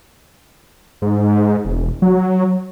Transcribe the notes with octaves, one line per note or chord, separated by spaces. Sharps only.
G#2
E1
F#3